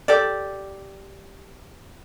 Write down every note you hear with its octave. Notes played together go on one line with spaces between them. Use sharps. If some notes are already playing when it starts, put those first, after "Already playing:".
G4 A4 D5